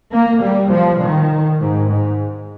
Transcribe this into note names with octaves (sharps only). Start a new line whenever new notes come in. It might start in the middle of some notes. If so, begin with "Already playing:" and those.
A#3
G3
F3
D#3
G#2
G#2